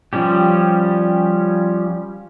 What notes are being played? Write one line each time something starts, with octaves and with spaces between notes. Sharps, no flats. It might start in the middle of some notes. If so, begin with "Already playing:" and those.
F3 G3 C#4 G4